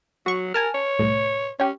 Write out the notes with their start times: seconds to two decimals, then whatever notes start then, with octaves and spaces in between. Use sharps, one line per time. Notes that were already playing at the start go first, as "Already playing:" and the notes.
0.26 F#3 F#4 C#6
0.54 A#4 G#5 A5 F6
0.74 C#5
0.99 C2 A2
1.60 C#4 G4 C#5